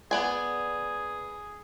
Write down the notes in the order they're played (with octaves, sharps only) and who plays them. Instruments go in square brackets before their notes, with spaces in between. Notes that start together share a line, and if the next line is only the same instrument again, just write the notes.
[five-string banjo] B3 D5 G#5 [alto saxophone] G#4